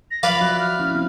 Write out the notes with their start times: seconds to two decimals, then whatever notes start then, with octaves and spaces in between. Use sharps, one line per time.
0.11 A#6
0.23 F3 F#3 B4 D5 F5 B5
0.41 F#4 E5 F#6
0.60 F6
0.79 C#4 E4
0.91 F3 C4